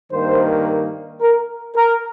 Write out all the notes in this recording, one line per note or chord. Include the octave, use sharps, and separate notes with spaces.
G2 D#3 A#3 C5
A#4
A#4